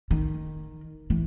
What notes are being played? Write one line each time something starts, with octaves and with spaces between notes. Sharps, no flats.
D#3
E3